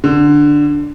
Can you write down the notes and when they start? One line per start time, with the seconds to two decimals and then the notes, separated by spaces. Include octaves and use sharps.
0.04 D3